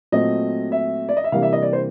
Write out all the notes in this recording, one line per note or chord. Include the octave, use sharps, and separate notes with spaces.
A#2 F#3 A3 C4 D#5
E5
D5
D#5
E5
C3 E3 G3 A#3 D4 F5
E5
D#5
D5
C5